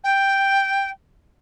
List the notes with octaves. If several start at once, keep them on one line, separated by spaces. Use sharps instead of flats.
G5